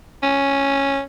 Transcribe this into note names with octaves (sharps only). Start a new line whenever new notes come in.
C#4